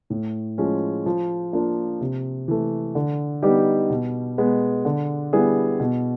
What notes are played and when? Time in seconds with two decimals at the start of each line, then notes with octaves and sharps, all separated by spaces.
0.10 A2
0.58 F3 G#3 C#4
1.06 F3
1.53 A#3 D4 F4
2.01 C3
2.48 E3 A3
2.95 D3
3.42 G3 B3 D#4 G4
3.90 B2
4.38 G#3 B3
4.85 D3
5.33 G3 B3 E4 G#4
5.80 B2